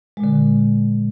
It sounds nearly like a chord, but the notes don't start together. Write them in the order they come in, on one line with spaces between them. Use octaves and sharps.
G#3 A#2 D3